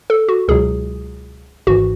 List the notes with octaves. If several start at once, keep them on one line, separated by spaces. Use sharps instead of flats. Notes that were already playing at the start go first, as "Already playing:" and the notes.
A4
F#4
C#2 B2 F#3 G#4
G#1 G#2 E3 F#4